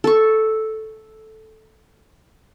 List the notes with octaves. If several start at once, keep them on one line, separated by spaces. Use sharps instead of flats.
A4 C#6